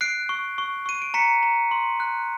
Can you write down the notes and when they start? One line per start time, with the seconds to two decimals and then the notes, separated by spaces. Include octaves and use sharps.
0.01 F#6 C7 D7
0.29 C#6
0.58 C#6
0.86 C#6 D#7
1.02 D7
1.14 A#5 B6 C#7
1.43 A#5
1.71 C6
2.00 F#6